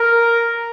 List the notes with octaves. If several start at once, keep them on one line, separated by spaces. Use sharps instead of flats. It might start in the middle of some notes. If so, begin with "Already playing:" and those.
Already playing: A#4